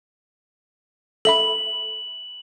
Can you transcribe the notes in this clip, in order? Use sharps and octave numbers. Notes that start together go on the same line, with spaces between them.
A4 E5 B5 F#7